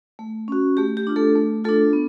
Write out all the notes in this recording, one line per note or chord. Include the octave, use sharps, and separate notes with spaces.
A3
C#4 F#4
A3 G4
G4
D4 F4
A3 A4
A3
A3 D4 F4 A4
B3